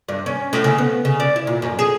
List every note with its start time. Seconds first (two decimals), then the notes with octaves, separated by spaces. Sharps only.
0.09 G2
0.26 C#4
0.53 A2
0.64 C#3
0.78 B3
1.05 C#3
1.20 D5
1.36 E4
1.47 A#2
1.62 F#2
1.79 G#4